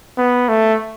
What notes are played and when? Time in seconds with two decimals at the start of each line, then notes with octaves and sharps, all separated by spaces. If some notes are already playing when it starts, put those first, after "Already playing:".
0.18 B3
0.49 A3